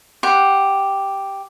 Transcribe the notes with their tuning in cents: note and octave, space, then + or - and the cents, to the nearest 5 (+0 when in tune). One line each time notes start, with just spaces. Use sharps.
G4 +0 F#5 +0 C6 +45